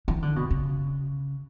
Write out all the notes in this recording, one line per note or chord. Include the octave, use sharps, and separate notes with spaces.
E3
D3
B2
C#3